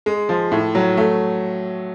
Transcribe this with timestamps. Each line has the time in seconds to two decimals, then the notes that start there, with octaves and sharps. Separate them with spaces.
0.06 G#3
0.29 F3
0.52 A2
0.75 F#3
0.97 A3